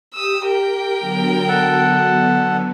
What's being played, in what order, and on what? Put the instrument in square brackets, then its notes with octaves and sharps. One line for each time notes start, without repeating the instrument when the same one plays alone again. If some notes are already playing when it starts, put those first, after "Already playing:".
[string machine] G4 [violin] D#6 E6
[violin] A#4 G5
[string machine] D3 F#3 B3
[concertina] A4 F#5 A5